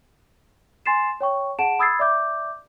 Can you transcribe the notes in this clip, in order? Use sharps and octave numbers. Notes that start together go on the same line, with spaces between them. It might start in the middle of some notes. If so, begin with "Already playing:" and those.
G#5 C6 A6 C7 E7
C#5 G5 C#6
G#4 F#5 A5 D7 E7
B5 D#6 E6 G#6 A6 C7
D5 E5 D6 G6